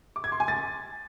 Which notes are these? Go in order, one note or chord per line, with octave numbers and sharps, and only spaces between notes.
D6
G#6
C6
G#5
A6